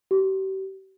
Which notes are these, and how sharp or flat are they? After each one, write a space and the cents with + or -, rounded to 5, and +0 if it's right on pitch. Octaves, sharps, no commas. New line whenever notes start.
G4 -40